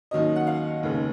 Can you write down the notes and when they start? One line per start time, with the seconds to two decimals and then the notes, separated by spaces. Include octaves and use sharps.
0.11 D#2 D#3 F#3 C#4 D#5
0.36 F#5
0.47 F5
0.83 F1 D#2 C#3 G#3 C#4